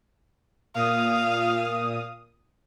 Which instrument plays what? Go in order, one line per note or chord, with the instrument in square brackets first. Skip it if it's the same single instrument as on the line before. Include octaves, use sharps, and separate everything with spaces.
[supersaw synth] A#2 D#6 [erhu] F5